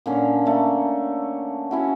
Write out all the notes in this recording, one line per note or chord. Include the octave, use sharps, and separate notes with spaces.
A#2 D3 C#4
A3 A#3
C#4 E4 F#4